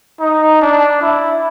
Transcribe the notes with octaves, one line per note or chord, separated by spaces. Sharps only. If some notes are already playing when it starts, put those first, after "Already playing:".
D#4
D4
E4